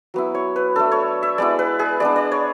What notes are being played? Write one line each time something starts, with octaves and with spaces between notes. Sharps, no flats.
F#3 B3 E4
C#5
B4
A3 D4 A4
C#5
E5
G#3 B3 E4 D5
B4
G#4
G#3 B3 D4 D5
D5
C#5